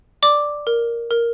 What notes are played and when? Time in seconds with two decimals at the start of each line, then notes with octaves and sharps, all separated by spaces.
0.23 D5 D6
0.67 A#4
1.11 A#4